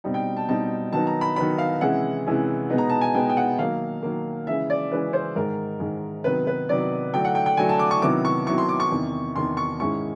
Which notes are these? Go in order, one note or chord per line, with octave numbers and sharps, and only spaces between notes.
B2 G3 C4 D#4
G5
A5
B2 G3 C4 D#4 A5
D#3 F#3 B3 D#4 A5
A#5
B5
D#3 F#3 B3 D#4 B5
F5
C3 E3 G#3 C#4 E4 F#5
C3 E3 G#3 C#4 E4
B2 G#3 B3 D#4
A#5
A5
G#5
B2 G#3 B3 D#4 G5
G5
F#5
D#3 F#3 A#3 F5
D#3 F#3 A#3
C#3 E3 G#3 C#4 E5
D5
C#3 E3 G#3 C#4 B4
C5
G#2 D#3 G#3 A#4
G#2 D#3 G#3
C3 D#3 F#3 B3 B4
B4
C3 D#3 F#3 B3 D5
D3 F#3 A3 D4 G5
F#5
G5
G5
D3 F#3 A3 D4 G#5
A5
D6
C#6
C3 D#3 F#3 B3 E4 D6
C#6
C3 D#3 F#3 B3 E4 C#6
C6
D6
C#6
E2 C3 D#3
E2 C3 D#3 C6
C#6
G#2 D#3 G#3 C#4 E4 C#6